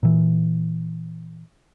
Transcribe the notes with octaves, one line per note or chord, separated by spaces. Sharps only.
A#2 E3